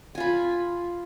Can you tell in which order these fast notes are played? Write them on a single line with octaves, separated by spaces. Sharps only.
G#5 F4 B5